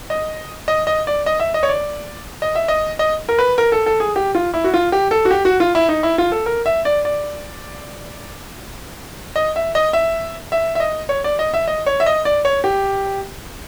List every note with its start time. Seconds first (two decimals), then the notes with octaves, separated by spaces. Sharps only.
0.10 D#5
0.68 D#5
0.87 D#5
1.07 D5
1.26 D#5
1.40 E5
1.54 D#5
1.63 C#5
1.69 D5
2.42 D#5
2.55 E5
2.68 D#5
2.99 D#5
3.29 A#4
3.39 B4
3.58 A#4
3.72 A4
3.86 A4
4.00 G#4
4.16 G4
4.35 F4
4.54 E4
4.64 F#4
4.74 F4
4.92 G4
5.11 A4
5.25 F#4
5.31 G4
5.45 F#4
5.60 F4
5.75 E4
5.89 D#4
6.03 E4
6.18 F4
6.32 A4
6.46 A#4
6.66 E5
6.85 D5
7.05 D5
9.36 D#5
9.56 E5
9.75 D#5
9.93 E5
10.52 E5
10.75 E5
10.80 D#5
11.09 C#5
11.24 D5
11.39 D#5
11.54 E5
11.68 D#5
11.86 C#5
12.00 E5
12.06 D#5
12.25 D5
12.45 C#5
12.64 G4